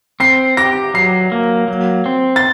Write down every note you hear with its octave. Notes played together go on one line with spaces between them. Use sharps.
C4 C7
G4 A#6
F#3 C7
A#3
F#3
C4
A6